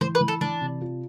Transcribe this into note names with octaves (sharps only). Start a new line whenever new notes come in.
E3 C5
B4
E3
A4
E3 D4
C3
F4